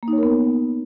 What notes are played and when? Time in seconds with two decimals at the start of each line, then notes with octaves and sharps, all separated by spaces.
0.03 A#3
0.08 D#4
0.13 C#5
0.18 A#4
0.23 B3